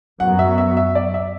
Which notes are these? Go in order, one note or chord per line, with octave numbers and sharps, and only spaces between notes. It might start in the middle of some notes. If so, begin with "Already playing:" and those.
F#2 F#3 B3 F#5
E5
E5
E5
D5
E5